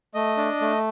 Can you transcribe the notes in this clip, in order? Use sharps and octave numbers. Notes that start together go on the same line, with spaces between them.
A3 D#5
D4
A3